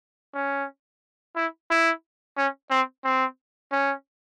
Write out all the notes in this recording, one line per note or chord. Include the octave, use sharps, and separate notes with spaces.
C#4
E4
E4
C#4
C4
C4
C#4